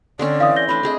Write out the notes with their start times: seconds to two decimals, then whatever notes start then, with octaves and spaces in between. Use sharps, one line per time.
0.19 D3 C4 C#4 D5
0.40 E3 F5 D#6
0.56 G6 A#6 G7
0.69 A3 D4 B5
0.83 C4 G#4 D#5